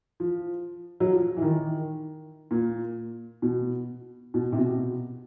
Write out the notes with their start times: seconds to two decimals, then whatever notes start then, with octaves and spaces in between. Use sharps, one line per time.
0.20 F3
1.00 F#3
1.12 F3
1.37 E3
1.42 D#3
2.51 A#2
3.42 B2
4.34 B2
4.52 C3
4.58 B2